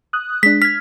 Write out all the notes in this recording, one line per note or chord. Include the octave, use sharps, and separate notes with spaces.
D#6 F#6
G#3 D4 B6
F6 G#6 B6